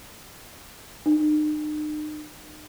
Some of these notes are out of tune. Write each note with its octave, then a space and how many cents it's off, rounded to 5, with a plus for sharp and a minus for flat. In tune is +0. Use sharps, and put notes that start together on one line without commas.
D#4 -40